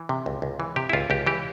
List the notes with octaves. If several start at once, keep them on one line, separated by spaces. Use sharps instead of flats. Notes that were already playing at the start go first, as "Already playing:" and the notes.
Already playing: E3
C3
C#2
C#2
E3
C3 G4
E4
C#2 F4
C#2 G4
E3 G4